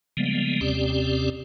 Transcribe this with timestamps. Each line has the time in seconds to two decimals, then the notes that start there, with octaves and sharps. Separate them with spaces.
0.17 C#3 F3 G3 G#3 A#3 B3
0.61 D#2 C3 C4 C#4 G4 D5